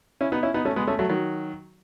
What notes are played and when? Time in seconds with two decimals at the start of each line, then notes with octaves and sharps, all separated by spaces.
0.21 C#4 E4
0.32 B3 D#4
0.43 C#4 E4
0.54 B3 D#4
0.65 A3 C#4
0.76 G#3 B3
0.87 A3 C#4
0.99 F#3 A3
1.10 D#3 F#3